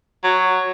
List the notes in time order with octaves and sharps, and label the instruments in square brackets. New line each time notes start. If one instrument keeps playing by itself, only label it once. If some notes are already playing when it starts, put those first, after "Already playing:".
[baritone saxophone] F#3